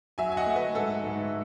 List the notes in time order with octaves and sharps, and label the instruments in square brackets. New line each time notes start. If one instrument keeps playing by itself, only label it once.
[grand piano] F#3 E5 G#5
G#5
D#5 F#5
A3
B4 D#5
G#2 A4
G#2